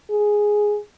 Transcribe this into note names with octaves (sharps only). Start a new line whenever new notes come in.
G#4